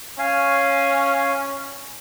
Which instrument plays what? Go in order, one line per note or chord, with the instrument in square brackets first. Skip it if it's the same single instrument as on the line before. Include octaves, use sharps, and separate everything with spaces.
[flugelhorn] C#4 [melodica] F5 G#5